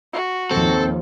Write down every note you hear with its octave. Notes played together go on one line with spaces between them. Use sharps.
F#4
D#2 G#2 F3 C4 A4